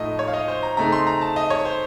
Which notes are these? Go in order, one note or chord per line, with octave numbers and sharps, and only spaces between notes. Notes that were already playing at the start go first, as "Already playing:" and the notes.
Already playing: A2 F3 A3 D#4 D#5
C#5
F5
D#5
C5
A#5
C#3 A3 C4 D#4 A#5
C6
A#5
A5
D#5
C#5
C5